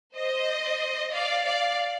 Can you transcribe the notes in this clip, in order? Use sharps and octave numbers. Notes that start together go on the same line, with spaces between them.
C5 D#5
D5 F5
D5 F5